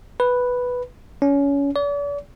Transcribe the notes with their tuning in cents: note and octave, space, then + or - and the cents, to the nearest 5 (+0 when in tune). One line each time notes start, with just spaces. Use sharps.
B4 +0
C#4 +25
D5 -40